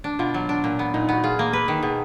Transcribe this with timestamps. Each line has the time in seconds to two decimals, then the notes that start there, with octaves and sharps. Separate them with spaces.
0.04 D4
0.19 B2 F4
0.34 F#3
0.49 D4
0.64 A#2
0.79 B3
0.94 A#2 D#4
1.09 B3 F#4
1.24 F4 G#4
1.39 A#3
1.53 B4
1.68 D#3
1.83 B2 G#4